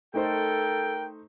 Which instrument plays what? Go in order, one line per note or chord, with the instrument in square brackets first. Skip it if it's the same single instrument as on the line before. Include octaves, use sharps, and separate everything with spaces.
[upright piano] A3 D#4 C5 [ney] A4 [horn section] A#4 G5